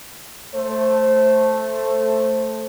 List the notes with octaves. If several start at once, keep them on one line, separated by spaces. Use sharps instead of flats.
A3 C5